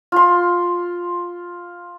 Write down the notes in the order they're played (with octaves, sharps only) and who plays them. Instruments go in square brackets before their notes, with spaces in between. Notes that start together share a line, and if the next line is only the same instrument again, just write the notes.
[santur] F4 C6